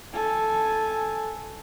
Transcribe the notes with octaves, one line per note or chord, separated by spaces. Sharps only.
A4 G#5